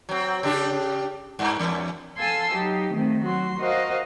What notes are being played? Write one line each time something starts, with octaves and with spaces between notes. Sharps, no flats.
F#3 C4
C#3 D4 G4
G2
E2
A4 F5 G#5 A5 C6 E6
F#3 D#4 G4
D#3 A3 C4
F#3 F#4 C6
F#4 A#4 C5 D#5 F5